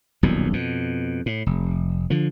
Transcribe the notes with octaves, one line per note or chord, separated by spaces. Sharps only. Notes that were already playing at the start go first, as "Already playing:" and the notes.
D#1 B1 F2 A#2
F2 B2
A2
F1
D3 F3